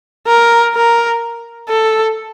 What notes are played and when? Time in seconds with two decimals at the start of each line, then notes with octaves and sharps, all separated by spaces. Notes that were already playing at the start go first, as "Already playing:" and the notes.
0.27 A#4
0.75 A#4
1.69 A4